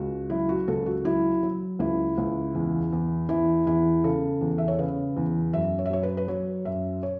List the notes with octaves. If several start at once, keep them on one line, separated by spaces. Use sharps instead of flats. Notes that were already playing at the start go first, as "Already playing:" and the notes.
Already playing: C#2 F#4
F#3 E4
F#4
C#2 A4
F#4
F#3 E4
F#3
C#2 E4
C#2
E2
E2
E2 E4
E2 E4
C#3 A4
E2
E5
C#5
C#3 B4
E2
F#2 E5
C#5
E5
F#3 C#5
B4
B4
F#3 C#5
F#2 E5
C#5